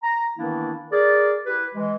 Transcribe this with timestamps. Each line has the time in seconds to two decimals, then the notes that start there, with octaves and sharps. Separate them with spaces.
0.03 A#5
0.38 D#3 E3 A#3 B3 D4 E4
0.92 G#4 A#4 D5
1.46 E4 G4 B4
1.75 E3 G#3